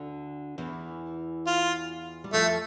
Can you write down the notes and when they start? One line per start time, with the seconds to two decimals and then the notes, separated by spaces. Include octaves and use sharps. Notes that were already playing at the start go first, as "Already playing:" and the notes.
Already playing: D2 D3
0.58 E2 E3
1.47 F4
2.24 G3
2.33 F2 F3 A3